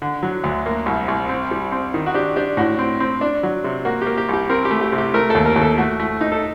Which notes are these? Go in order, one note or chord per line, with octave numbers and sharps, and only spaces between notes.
D3
F#3
D2
A#3
C2
C2
C4
G3
C4
D#3
F#4
D4 G4
D4 G4
A2 F#4
C4
C4
D4
F#3
C3
A#3 F#4
A#3 G4
G4
C2 G4
C4 A#4
G4
A3
G4
C3
G4
A3 A#4
D#2 A4
A#4
D#2
A4
A3 F#4
A3
D#4
A4